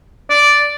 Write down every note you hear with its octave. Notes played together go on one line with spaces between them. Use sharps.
D5